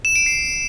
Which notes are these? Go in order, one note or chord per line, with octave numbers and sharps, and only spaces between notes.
E7
D7
C7